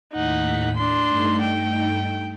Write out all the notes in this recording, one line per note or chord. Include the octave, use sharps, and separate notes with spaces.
D#2 A2 D#4 F#5 B6
D4 C6
G2 A3 D#4
G5